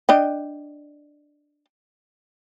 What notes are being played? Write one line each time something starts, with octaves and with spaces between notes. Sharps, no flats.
D4 D#5 G5